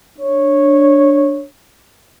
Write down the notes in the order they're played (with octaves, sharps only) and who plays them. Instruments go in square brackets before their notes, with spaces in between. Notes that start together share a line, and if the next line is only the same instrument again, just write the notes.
[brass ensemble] D4 C#5